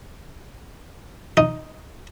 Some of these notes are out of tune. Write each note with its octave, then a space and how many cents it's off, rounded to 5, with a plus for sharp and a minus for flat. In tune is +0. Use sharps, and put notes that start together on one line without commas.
D#4 +0